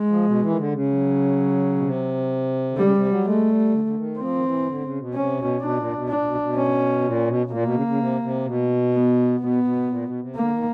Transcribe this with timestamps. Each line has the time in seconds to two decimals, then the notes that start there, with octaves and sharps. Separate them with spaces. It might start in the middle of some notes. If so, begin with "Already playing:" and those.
Already playing: G#3
0.09 F3
0.25 B2
0.41 E3
0.50 D#3
0.57 D3
0.72 C#3
0.88 F#3
1.77 B2
1.83 C3
2.72 D3
2.77 C#3 G3
2.93 C3
3.09 F#3
3.24 G#3 A3
3.48 G3
3.72 D3
3.84 D3
3.96 D#3
4.19 F3 C4
4.35 D#3
4.43 E3
4.67 D3
4.82 C#3
4.98 B2
5.14 C3 C#4
5.38 B2
5.61 B2 D4
5.77 A#2
5.93 B2
6.09 A#2 D4
6.20 A#2
6.24 B2
6.40 B2
6.56 C#4
7.04 A#2
7.28 B2
7.47 B2
7.51 A#2 A#3
7.63 B2
7.74 C#3
7.86 C#3
7.98 C3
8.21 C3
8.45 B2
8.93 B3
9.40 B2 B3
9.63 B2
9.88 A#2
10.04 B2
10.19 C3
10.35 D3 A#3
10.50 D#3